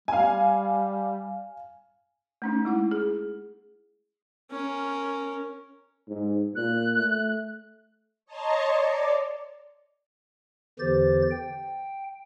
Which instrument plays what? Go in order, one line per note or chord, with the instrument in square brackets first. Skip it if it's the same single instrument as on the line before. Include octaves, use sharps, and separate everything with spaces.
[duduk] G3 [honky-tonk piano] F5 G#5
[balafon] A3 C#4 D#4
G#3 E4 F#5
G#4
[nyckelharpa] C#4 A#4
[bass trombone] G#2
[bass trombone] A#2 [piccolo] F#6
[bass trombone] A3
[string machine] C#5 D#5 A5 A#5 C6 C#6
D5
[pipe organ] E2 D3 E3 G4 C5 A6
G5